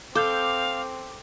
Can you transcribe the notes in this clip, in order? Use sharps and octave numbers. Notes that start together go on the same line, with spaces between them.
C4 A4 F5 D6 G6